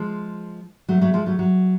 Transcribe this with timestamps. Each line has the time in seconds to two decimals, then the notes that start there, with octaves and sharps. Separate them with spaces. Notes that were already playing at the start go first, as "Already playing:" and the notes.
Already playing: F3 G#3
0.88 F#3 A3
1.01 F#3 A3
1.13 F3 G#3
1.26 F#3 A3
1.39 F#3